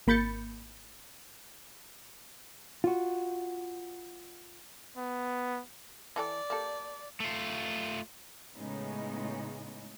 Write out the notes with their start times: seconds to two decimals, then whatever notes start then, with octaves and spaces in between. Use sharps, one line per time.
0.07 G#1 A#3 B5 G6 A6 C#7
2.84 F4 F#4
4.97 B3
6.16 E3 A4 D5 G5
6.50 A#3 G4 A4
7.20 A3 F4
8.56 A2 C#3 G#3 B3 C#4 D#4